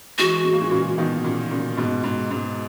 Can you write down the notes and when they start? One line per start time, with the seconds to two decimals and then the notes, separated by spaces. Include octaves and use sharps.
0.18 E3 G#3 F#4
0.45 G#3
0.53 A#3
0.61 E3 G#3
0.71 A#2 C#3
0.98 B2 D#3
1.24 A#2 C#3
1.51 A#2 C#3
1.77 G#2 B2
2.04 G#2
2.31 G#2